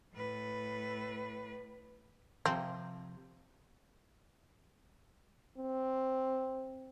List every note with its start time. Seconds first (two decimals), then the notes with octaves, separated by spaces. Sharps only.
0.14 A2 B4
2.46 C3 F3 C4
5.57 C4